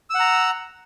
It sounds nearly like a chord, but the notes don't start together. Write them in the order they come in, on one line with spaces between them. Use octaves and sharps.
E6 F#5 A#5